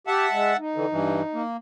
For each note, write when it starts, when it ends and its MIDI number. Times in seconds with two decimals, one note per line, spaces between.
0.07 0.26 67
0.07 0.57 76
0.07 0.57 78
0.07 0.57 81
0.31 0.53 56
0.58 1.42 63
0.76 0.86 50
0.76 0.86 52
0.92 1.22 43
0.92 1.22 52
1.34 1.57 58